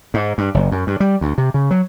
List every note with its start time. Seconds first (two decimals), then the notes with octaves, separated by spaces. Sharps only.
0.14 G#2
0.38 G2
0.54 F#1
0.72 F#2
0.87 G2
1.00 G3
1.21 D2
1.38 C3
1.54 C#3
1.71 F#3